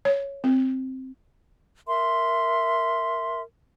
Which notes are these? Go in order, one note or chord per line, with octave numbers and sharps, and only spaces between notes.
C#5
C4
A#4 E5 C6